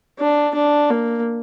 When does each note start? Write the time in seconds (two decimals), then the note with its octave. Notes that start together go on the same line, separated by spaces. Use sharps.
0.19 D4
0.54 D4
0.90 A#3